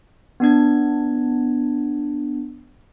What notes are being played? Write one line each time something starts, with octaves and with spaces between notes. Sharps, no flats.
B3 D4 G#6